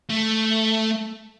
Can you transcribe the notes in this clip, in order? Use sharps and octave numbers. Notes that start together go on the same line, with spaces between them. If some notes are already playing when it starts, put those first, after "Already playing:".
A3